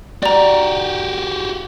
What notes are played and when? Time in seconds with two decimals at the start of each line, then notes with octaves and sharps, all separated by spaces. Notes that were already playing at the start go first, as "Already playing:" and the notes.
0.23 F#4 G4 D5 A#5